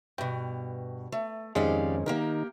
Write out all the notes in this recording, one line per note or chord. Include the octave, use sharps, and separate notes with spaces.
G2 B2 G5
A3
F2 G#2 D#3 G#3 C#4 G4 D5 F5
D#3 A#3 D#4 G4 A#4